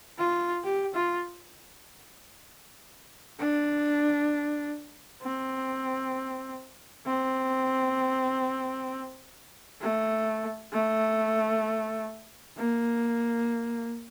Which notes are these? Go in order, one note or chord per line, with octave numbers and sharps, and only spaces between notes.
F4
G4
F4
D4
C4
C4
A3
A3
A#3